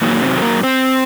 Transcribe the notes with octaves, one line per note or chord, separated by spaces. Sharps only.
F#2 A#2 D#3 F#3 A#3
C3 C4
A4
A#3 A#4
C4 C5